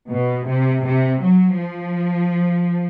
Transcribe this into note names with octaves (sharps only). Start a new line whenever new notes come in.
B2
C3
C3
F#3
F3